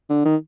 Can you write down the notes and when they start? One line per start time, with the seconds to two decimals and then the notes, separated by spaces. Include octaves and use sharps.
0.10 D3
0.25 D#3